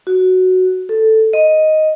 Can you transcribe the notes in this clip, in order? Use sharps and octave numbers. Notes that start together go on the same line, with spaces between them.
F#4
A4
D#5